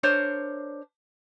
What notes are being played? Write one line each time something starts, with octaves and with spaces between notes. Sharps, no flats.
D4 A#4 C5 C#5